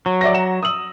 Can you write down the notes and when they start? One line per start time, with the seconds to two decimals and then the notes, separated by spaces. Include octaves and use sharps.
0.06 F#3
0.21 D5 E5 A#6
0.33 F#5 A#5 E7
0.63 D#6 E6 F#7